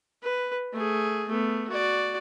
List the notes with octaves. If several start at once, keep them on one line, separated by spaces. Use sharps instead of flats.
B4
A3 G#4
A3 B3
F#4 D5